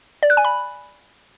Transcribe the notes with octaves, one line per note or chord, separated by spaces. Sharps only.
D5
F#6
G#5
B5